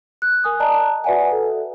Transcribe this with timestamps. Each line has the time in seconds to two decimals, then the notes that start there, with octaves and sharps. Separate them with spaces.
0.22 F#6
0.44 A#4 G#5 D#6
0.60 D5 D#5 A5 A#5
1.04 F#4 B4 D5 E5 F#5 G#5
1.32 A4